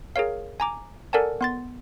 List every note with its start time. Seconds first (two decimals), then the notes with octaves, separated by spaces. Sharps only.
0.16 G#4 A#4 C#5 F5
0.60 G#5 A#5 D6
1.13 A4 A#4 D5 F#5 G#5 A5
1.41 B3 C6 A6